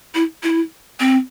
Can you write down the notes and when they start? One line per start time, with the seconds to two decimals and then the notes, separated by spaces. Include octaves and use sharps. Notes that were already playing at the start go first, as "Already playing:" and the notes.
0.15 E4
0.43 E4
1.00 C4